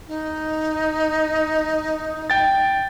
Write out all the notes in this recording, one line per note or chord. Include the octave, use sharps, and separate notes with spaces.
D#4
G5 A6